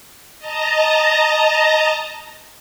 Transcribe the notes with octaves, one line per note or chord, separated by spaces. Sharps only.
D#5 A5 A#5